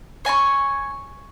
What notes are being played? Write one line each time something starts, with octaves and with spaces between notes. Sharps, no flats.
C#5 G#5 A5 C#6